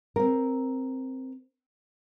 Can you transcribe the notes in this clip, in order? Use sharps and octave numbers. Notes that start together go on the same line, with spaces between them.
C4 A#4